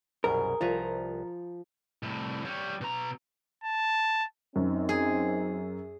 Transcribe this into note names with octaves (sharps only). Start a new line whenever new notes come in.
C2 F#2 B2 G#4 A#4
C2 F3 B4 A#5 C#6
C2 A2
G3 C#5
B2 A#5
A5
F#2 C4 D#4
G#4